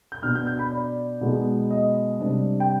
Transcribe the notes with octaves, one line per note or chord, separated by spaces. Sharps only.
G6
B2 B3 D4 F6
G6
G6
B5
D5
B2 G#3 B3 D#4
D#5
C3 G3 D4
G5